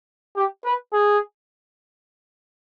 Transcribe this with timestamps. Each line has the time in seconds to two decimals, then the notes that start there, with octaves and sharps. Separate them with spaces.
0.36 G4
0.65 B4
0.93 G#4